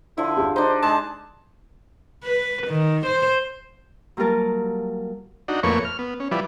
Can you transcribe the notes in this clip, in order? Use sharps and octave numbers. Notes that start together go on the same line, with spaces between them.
D3 F3 E4
G4 G#4 F5
D4 D#4 C5
G#3 A5
B4
D#3
C5
F#3 G3 A#3 F4 A#4 A5
D4 D#4 F#4
F2 A3 A#3 B4 C#5 C#6
F6
B3
C#4
F3 G3 E4 B4 D5